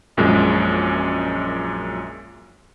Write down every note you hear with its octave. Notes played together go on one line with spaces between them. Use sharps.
A#1 F#2 A#2 G#3